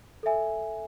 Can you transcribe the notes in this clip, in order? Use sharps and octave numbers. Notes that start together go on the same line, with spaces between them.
A4 E5 G#5